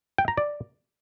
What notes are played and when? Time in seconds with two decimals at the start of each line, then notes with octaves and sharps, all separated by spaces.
0.18 G5
0.28 A#5
0.37 D5